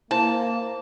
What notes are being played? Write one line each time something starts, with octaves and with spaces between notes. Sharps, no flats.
A#3 E4 C5 A5